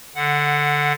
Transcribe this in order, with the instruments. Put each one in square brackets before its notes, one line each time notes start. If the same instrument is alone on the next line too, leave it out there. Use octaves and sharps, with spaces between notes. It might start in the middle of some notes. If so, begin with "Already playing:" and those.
[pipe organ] D3 F#5